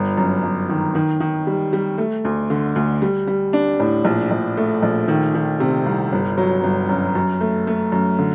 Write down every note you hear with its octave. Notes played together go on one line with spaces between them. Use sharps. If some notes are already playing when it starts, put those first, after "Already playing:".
Already playing: G1
F#2
G1
D#3
D#3
D#3
G3
G3
A3
D2
D3
D2
G3
G3
D4
A2
A#1
A#1
A3
A#1
D#3
D#3
C3
C2
G1
F#3
G1
F#2
F#2
A3
A3
F#2
D3